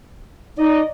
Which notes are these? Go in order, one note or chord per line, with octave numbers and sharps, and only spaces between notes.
D#4 D5 D#5